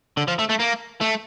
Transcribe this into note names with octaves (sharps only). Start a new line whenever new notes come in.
D3
F3
A3
A3
A#3
A3